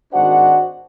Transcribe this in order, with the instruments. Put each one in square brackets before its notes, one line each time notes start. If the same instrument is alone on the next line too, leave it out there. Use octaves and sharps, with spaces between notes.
[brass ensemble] G#1 D4 D#4 F#4 C5 F#5